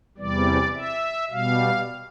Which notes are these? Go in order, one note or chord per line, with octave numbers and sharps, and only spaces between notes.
E2 C3 E3 G3 D5
E5
B2 G3 F5